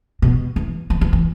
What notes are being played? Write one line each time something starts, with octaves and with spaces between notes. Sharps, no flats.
B2
E3
E3
E3
E3